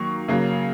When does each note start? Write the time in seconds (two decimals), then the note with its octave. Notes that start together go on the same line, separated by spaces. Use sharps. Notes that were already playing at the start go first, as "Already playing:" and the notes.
Already playing: D#3 F#3 A#3 C#6
0.28 C#3 F#3 A#3